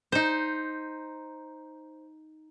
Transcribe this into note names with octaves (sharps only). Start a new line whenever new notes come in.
D#4 C5